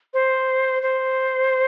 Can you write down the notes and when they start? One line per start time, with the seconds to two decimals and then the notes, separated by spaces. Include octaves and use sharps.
0.14 C5
0.83 C5